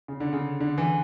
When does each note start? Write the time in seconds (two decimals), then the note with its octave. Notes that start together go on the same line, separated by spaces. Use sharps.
0.08 C#3
0.20 D3
0.33 C#3
0.60 D3
0.78 E3